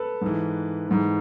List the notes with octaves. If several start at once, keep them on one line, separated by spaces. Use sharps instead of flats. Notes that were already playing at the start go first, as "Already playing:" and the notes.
Already playing: A4 B4
G#2 E3
G#2 E3